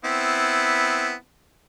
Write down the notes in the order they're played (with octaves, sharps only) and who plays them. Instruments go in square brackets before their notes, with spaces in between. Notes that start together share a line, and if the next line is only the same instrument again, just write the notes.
[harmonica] B3 C4 E4